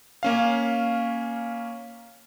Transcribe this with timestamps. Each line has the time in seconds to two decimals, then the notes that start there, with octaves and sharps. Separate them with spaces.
0.23 A#3 C#4 F5